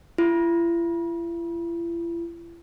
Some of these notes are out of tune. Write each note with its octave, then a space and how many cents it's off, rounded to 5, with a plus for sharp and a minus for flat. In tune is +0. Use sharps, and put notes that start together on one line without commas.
E4 +45